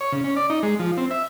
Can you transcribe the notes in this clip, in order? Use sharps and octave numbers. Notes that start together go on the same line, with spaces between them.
C#5
C#3
C#4
D5
D#4
G#3
F3
C4
E5